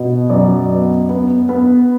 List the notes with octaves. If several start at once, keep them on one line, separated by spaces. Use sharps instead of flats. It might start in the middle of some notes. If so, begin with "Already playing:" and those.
Already playing: B2
F#2 D5
B3
B3
B3